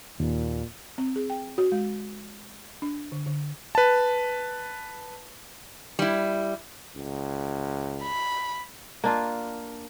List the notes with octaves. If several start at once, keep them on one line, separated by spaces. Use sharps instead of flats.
D#2 A#2
C4
G#4
G5
F#4
G#3
D4
D3
D3
B4 A5
G3 E4
C#2
B5
A#3 D4 F4